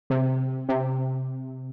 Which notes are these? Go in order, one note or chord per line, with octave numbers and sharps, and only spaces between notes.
C3
C3